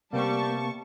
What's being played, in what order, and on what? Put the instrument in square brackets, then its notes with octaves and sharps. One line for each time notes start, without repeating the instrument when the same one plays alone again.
[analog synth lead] C3 [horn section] G3 [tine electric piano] A#3 B3 [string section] A5 C#6